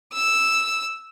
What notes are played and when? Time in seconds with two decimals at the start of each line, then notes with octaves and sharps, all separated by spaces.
0.13 E6